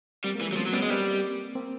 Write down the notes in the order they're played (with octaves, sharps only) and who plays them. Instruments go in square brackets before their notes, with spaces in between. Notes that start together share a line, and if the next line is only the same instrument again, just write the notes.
[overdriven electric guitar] G3 [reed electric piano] A#3 C4
[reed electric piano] G#3 A#3
[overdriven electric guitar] E3
[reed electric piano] G3 A3
[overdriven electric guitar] F#3
[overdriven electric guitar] F3 [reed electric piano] B3 C#4
[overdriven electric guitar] F#3
[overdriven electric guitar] G3 [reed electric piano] B3 C#4
[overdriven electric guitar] G#3
[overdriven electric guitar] G3 [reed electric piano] A#3 C4
[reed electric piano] A#3 C4